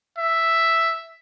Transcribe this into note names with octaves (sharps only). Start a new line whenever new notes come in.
E5